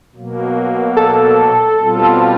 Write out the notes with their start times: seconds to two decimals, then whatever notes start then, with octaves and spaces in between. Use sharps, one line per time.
0.15 B2 F#3 A#3
0.97 A4
1.79 B2 G3 C4 F4